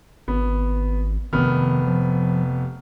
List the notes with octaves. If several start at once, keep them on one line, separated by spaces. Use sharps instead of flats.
G#1 B3
F1 D#3 B3 F6
F3